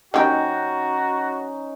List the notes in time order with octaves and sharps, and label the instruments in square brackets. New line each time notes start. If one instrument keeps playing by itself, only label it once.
[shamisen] D#3 G4 [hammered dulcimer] C#4 D#4 [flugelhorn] F#4